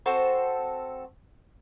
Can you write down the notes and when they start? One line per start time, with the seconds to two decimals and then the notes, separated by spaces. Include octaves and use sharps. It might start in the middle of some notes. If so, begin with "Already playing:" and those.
0.06 C4 F#4 A4 C5